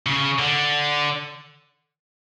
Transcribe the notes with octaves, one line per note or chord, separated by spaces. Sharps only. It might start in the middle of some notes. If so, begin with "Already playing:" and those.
C#3
D3